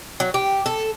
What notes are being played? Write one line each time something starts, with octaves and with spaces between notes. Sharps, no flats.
F#3
G4
A4